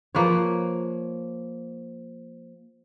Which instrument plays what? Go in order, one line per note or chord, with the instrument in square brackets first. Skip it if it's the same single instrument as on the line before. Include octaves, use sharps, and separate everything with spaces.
[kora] F3 A#3 B4 C#5